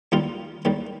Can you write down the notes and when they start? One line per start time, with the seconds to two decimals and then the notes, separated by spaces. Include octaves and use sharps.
0.12 D#2 D#3 G3 F4
0.65 D#2 D#3 G3